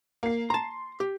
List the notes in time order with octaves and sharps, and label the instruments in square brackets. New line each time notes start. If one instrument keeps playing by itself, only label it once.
[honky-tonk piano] A#3 C7
[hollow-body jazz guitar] A5 A#5 [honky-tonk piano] C6
[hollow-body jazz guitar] G4